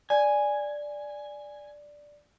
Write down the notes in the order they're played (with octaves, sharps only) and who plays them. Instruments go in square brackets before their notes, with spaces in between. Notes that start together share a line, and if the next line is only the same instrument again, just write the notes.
[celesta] D5 [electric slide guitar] G#5